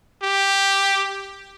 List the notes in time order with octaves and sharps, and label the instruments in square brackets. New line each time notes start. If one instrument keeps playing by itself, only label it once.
[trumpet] G4